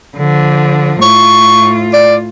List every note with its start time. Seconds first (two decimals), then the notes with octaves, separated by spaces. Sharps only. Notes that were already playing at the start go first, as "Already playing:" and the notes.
0.17 D3 F3
1.02 A2 F4 C#6
1.93 D5